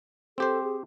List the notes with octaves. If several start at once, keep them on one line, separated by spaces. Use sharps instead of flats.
C4 G4 A4 C5
G#4